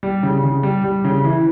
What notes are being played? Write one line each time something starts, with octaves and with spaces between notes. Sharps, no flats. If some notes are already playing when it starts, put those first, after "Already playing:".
G3
C#3
C#3
G3
G3
C#3
E3